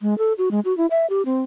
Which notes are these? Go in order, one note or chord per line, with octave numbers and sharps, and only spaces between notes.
G#3
A4
F#4
G#3
F#4
E4
E5
G4
C4